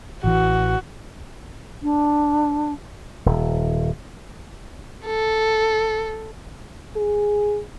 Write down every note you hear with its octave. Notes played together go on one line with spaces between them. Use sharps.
A1 E3 F#4
D4
D#1
A4
G#4